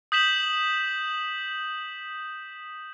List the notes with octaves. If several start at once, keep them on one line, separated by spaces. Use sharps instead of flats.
D#6 G6 B6 E7 F#7